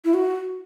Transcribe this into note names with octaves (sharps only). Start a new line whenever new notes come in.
E4
F#4